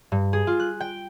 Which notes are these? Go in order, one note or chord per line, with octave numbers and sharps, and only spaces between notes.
G2
G#4
F4
F#6
G5